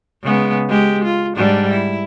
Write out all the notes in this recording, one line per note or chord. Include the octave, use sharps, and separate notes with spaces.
C#3 G#3 B3
G#3 G4
F4
G#2 G3 D4
E4